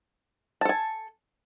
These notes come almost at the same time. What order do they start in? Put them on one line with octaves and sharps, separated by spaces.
A5 A4 G#5